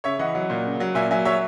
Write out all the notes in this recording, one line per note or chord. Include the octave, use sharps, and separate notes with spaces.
C#3 C#5 E5
E3 D#5 F#5
F#3
A#2
C#3
F#3
A#2 E5 G#5
F#3 E5 G#5
F#3 C#5 E5